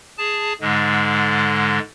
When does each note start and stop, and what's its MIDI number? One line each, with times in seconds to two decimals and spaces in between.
0.18 0.53 68
0.18 0.53 81
0.61 1.79 44
0.61 1.79 50
0.61 1.79 56